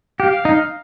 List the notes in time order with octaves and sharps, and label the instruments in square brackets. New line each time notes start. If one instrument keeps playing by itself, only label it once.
[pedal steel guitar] G4 [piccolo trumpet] F5
[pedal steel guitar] D#4